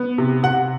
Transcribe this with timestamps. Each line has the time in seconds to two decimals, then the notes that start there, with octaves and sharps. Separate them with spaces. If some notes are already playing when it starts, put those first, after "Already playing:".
Already playing: B3
0.18 C3
0.43 C3 F#5